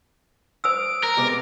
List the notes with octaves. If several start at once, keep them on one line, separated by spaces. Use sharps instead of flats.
C5 D#6 E6 D7
A#4
C3 G#3 B3 D6